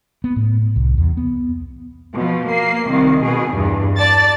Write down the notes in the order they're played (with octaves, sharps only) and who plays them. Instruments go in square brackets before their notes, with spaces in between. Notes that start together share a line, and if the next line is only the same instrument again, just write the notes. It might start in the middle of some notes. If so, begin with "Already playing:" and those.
[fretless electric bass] B3
A2
C2
E2
B3
[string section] B2 F3
A#3 C7
C2 D#3
B2 G#4
E2 G2
D5 A5 A6